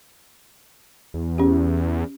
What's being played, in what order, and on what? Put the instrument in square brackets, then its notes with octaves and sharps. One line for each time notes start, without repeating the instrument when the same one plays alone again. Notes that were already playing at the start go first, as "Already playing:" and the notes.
[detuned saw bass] E2
[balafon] C#4 G4